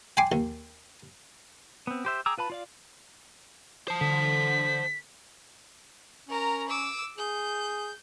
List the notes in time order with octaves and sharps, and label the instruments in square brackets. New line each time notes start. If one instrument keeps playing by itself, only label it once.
[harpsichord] G5 G#5 C6 D6
D#2
[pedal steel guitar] B3 C4
G4 C5 E5
G#4 G5 A#5 D6 E6
F4 B4 A5 B5
F4 D5 F5
[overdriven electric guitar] C5 A5 [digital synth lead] C7
[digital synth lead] D3 [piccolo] B6
[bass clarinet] C#4 [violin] A#4 A#5
[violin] D6 E6
[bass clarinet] G#4 [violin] G6